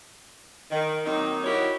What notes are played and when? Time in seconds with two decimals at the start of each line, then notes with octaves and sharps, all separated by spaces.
0.71 D#3
1.05 D#3 F#3 A#3 C4 D#4
1.44 E4 F#4 G4 A#4 C#5 D#5